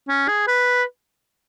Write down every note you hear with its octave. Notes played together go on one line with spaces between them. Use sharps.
C#4
G#4
B4